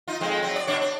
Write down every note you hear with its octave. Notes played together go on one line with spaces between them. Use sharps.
D#4 F4
F2 G#3 C4
F#3 C4
D5
B2 D4 C#5
D4